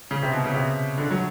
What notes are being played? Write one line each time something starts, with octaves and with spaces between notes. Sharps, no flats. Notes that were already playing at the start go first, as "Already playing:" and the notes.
C#3
C3
B2
C#3
C3
D3
F#3